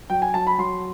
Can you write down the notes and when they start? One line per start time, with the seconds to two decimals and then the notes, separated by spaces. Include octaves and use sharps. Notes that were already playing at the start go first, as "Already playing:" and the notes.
0.10 F#3 G5
0.22 G#5
0.34 F#3 A5
0.47 B5
0.58 F#3 C6